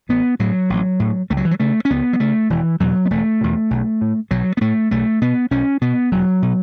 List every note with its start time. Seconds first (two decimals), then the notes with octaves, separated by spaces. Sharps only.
0.09 A1 B3
0.39 A2 F#3
0.70 A1
1.00 A2
1.30 C#2 A3
1.37 F#3
1.45 E3
1.51 F#3
1.60 C#3 A3
1.85 C#4
1.90 C#2 B3
2.13 F#3
2.20 C#3 A3
2.50 E1 E3
2.80 E2 B2 F#3
3.05 B3
3.10 E1 A3
3.41 E2 B2
3.71 B1
4.01 A2
4.31 B1 F#3
4.57 B3
4.61 A2 A3
4.91 B1 A3
5.21 B2 B3
5.51 B1 C#4
5.81 B2 B3
6.11 E1 F#3
6.42 B2